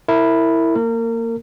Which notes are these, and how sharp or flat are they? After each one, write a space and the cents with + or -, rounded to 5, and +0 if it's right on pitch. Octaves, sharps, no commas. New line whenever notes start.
E4 +0 A#4 -30
A#3 -15 A#4 -30